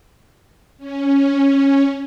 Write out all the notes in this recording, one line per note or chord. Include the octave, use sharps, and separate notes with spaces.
C#4